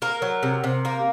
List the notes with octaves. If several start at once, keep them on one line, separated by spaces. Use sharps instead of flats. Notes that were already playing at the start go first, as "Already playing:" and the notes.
A#3 A#4
F#3
C3
C3
A#3